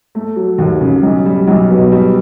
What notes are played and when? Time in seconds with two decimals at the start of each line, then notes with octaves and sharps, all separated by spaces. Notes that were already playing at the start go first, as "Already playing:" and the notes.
0.15 A3
0.36 F#3
0.58 D#2
0.81 C#3
1.03 B1
1.25 G3
1.47 B1
1.70 B2
1.92 G3